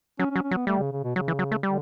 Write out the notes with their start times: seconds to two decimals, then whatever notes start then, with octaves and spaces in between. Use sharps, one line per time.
0.19 F#3 C#4
0.31 C#4
0.36 F#3
0.43 C#4
0.51 F#3
0.55 B3
0.67 G3 A3
0.79 C#3
0.92 C#3
1.04 B2
1.16 C#3 F#3
1.28 E3
1.39 F#3
1.51 A3
1.63 D3 G3